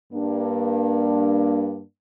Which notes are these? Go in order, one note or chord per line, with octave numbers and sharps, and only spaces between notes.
G2 A#3 D4